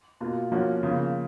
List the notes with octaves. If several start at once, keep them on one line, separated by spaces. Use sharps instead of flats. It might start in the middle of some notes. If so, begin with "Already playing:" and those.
B2 A#3 F4
F3 A#3 C#4 F#4
C#3 F3 A#3